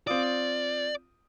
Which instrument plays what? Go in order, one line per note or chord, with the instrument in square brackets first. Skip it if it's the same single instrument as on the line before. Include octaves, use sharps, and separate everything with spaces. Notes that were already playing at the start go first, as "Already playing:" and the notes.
[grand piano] C4 F4 D#6 [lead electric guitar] D5